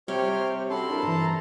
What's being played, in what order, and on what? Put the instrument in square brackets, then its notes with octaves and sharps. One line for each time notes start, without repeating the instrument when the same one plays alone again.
[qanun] C3 [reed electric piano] G3 [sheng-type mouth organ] G4 C#5 F6 [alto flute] C5
[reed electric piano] C#4 F#4 [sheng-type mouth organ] A4 A5 C6 [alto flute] B5
[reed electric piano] D4 E4 A#4
[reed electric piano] G2 E3 [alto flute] A#5